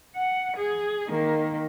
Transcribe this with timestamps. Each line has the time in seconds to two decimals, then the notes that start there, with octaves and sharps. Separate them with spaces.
0.15 F#5
0.56 G#4
1.08 D#3 A#3